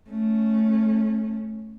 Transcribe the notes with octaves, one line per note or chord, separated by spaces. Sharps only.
A3 C#4